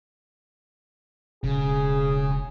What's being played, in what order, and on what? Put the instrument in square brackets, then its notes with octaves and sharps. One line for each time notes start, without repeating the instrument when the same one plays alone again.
[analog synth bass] E1 [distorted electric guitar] C#3 [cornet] G#4